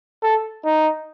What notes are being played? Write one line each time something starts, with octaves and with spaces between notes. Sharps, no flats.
A4
D#4